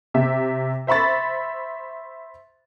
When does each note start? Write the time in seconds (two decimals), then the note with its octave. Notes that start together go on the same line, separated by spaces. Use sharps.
0.14 C3 G4 E5
0.87 C5 E5 B5 C#6 A6